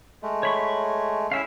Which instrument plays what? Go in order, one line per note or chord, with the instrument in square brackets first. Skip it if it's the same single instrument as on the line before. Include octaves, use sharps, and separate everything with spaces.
[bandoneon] G#3 A3
[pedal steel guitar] C#5 B5 C#6
[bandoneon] C#4 [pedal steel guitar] E4 E5 F5